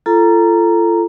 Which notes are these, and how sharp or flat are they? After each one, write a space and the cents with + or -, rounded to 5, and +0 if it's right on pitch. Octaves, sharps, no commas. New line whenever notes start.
F4 -35 A4 +0 A#5 +0